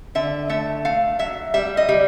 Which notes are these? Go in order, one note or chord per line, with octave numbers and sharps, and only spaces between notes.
D3 E5
A3 E5
A3 F5
F#3 E5
G3 E5
D#5
G3